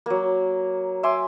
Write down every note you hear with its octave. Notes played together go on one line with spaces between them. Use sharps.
F#3 A#3
E5 G#5 C6 D6